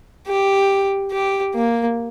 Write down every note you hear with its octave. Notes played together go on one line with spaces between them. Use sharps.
G4
G4
A#3